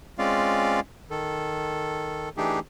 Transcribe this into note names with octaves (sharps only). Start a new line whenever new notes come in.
G#3 C4 C#4 F4 D5 F5
D#3 A4
E3 A3 D4 D#4 G4 G#4